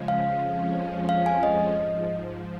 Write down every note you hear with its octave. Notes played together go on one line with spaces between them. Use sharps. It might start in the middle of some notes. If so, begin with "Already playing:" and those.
Already playing: C#3 F3 G#3
F5
F2 F3 G#3 C#4
F5
G#5
D#5
G#2 F3